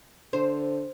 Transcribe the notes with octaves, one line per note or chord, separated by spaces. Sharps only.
D3 C5